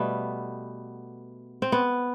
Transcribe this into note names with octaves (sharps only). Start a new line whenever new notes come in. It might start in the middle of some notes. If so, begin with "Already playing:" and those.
Already playing: B2 G3 A3 B3
C4
B3